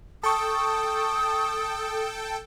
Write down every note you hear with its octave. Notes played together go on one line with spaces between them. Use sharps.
A4 G5 A5 C#6 D#6